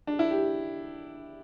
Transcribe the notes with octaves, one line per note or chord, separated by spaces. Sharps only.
D4
E4
G4